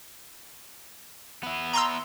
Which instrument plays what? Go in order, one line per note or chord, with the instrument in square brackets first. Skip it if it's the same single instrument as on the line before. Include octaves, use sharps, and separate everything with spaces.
[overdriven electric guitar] B3 E4
[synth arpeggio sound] A#5 C6 E6